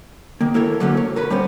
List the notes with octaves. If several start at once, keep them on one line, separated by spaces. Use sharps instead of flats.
D#3 A#3
A#3 E4 A4 A#4 C#5
D3 F#3 A3 A#3 C#4
C#5
A#4 B4 B5
G3 B3 C#4 C5